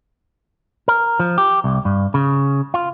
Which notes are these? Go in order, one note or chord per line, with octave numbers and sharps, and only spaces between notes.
A#4
F3
G4
C2
G2
C#3
F4